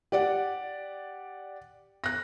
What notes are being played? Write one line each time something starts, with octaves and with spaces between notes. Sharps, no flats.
G4 D5 F#5
F#6 A#6